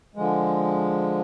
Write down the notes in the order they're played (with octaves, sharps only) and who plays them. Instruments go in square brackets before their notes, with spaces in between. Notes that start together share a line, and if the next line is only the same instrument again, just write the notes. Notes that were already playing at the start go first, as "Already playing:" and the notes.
[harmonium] D3 F3 G#3